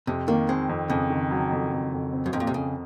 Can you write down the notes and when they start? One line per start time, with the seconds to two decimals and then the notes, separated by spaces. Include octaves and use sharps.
0.07 F2 C3
0.28 D#3 A#3
0.49 G#3 C4
0.69 F2
0.90 F2 C#3
1.10 D#3
1.31 F#3
1.52 F2
1.72 F2
1.93 F2
2.13 C4
2.26 F#2
2.33 F2 G#2
2.40 A#2
2.47 C3
2.54 F2 C#3